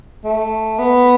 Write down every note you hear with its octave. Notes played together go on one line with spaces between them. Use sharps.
A3
B3